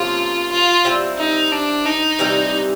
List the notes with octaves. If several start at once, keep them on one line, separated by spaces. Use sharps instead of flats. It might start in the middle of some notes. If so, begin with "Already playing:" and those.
Already playing: C3 F3 A#3 C#4 F4
F4
G3 C4 E4
D#4
D4
D#4
C3 E3 G3